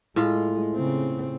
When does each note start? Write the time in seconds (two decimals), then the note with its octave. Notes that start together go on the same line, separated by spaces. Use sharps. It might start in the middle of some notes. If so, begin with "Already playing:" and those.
0.16 A2 G#3 F4
0.75 C#3 C4